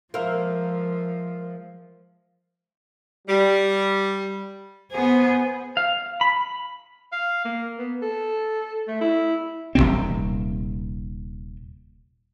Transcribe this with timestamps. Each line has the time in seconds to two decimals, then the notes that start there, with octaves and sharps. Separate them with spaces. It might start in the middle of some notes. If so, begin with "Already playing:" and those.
0.14 F3 G#3 A#3 A#4 C5 E5 F5
3.28 G3
4.91 B3 G#4 C5
5.77 F5
6.21 B5
7.12 F5
7.45 A#3
7.78 B3
8.02 A4
8.88 A3
9.01 E4
9.75 D#1 A#1 C3 C4